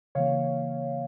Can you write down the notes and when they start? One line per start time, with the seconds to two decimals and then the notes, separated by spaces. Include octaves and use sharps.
0.15 C#3 E3 A#3 C#5 F5